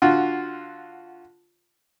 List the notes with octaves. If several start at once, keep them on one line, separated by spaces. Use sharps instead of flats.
D3 F4 F#4